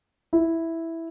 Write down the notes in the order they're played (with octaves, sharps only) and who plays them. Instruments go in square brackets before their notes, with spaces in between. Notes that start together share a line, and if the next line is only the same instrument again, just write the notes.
[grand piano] E4